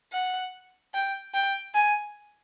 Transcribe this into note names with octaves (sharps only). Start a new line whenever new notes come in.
F#5
G5
G5
G#5